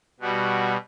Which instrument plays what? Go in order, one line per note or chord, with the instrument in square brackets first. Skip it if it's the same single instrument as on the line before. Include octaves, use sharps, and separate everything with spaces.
[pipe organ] B2 G3 F#4